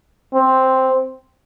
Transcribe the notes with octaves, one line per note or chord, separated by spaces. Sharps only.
C4